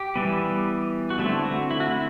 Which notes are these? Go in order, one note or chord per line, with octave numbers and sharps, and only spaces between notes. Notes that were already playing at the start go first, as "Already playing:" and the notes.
Already playing: G4
E3 G3 B3
F#4
D3 A3 C4 E4
F#4
E4
F#4
E4